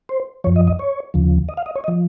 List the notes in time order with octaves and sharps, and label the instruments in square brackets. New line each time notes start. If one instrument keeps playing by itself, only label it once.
[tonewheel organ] C5
F#2 F3 C#5
D#5
D#5
C#5
D#2 C#3 F3
D#5
F5
D#5
C#5
D#5
F3